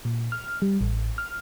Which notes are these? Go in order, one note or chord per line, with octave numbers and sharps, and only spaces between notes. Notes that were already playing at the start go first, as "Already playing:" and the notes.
A#2
F6
G3
A1
F6